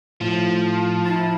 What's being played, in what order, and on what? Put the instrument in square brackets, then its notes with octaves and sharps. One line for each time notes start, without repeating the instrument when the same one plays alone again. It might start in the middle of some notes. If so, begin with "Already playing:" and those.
[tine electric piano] A2 [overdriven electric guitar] F3
[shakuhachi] E4 [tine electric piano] A5